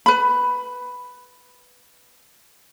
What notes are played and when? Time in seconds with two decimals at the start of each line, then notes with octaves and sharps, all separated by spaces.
0.06 B4 B5